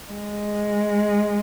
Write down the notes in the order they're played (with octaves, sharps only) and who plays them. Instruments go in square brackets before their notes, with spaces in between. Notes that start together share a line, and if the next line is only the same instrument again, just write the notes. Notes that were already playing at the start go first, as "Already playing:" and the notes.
[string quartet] G#3